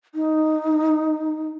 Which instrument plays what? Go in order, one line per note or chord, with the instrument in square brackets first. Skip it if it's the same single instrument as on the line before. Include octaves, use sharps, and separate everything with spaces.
[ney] D#4